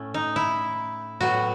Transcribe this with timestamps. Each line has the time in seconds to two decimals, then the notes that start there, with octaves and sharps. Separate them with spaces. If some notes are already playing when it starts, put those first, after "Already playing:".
Already playing: A2 A3 C#4
0.14 D#4
0.36 E4
1.21 A2 F#3 B3 F#4